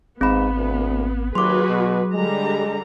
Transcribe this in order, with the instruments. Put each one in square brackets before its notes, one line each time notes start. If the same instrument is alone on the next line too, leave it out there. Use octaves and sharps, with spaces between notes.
[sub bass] G#1 [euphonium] G#2 [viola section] B3 [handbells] C4 B5
[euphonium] D2
[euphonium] D#2 [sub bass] F#3 [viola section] F#4 G#4 B4 [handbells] C6 D6
[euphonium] B2
[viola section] D3 G3 A#5 [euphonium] G#3